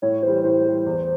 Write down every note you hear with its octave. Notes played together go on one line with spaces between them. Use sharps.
A2 C#5
E3 G3 C5
A2 C5
E3 G3
E2